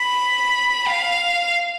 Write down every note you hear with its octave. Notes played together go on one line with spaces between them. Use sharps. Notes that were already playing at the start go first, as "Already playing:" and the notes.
Already playing: B5
F5